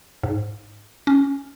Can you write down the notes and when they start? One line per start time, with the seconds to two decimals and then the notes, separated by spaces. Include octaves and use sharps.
0.23 G#2
1.07 C#4